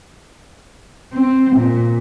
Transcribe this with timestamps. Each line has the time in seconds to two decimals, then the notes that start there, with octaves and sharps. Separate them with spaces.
1.14 C4
1.56 A#2